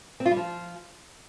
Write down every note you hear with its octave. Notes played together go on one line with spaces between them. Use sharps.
C4
F4
G3
F3